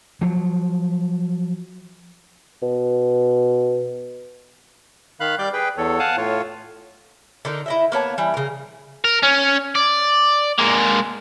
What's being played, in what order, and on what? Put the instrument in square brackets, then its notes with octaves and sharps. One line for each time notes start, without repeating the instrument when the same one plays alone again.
[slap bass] F3 F#3
[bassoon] B2
[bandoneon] D#3 F5 B5 F#6
G3 D5 D6 G6
G#4 B4 G5
E2 A4 C#5
F5 F#5 G#5 A5
A2 F4 C#5
[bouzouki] D3 D#4 A#4
E4 D#5 E5
A#3 B3 C#5 A5
E3 G3
C#3 A#4
[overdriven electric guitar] A#4
C#4
D5
G#3 A#3